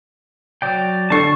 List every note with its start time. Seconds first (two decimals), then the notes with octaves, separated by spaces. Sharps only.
0.62 F#3 D5 G5
1.10 D3 A4 A5 C#6 C7